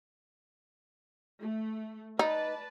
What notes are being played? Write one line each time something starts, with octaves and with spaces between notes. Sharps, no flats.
A3
D#4 B4 D5 A5